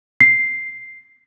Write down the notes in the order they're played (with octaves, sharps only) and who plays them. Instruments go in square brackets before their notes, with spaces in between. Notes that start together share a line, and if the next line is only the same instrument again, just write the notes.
[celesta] C7